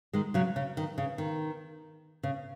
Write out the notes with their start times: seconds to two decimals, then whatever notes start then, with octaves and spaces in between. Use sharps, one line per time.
0.13 D#3 G#3
0.34 C#3 F#3
0.56 C#3
0.77 D#3
0.98 C#3
1.18 D#3
2.23 C#3